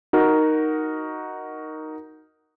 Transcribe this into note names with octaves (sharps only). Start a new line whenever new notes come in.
D#4 F#4 A#4